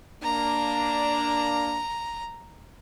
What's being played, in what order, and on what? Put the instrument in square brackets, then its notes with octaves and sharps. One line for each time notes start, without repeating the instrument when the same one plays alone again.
[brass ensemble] A#3 D4 [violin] A#5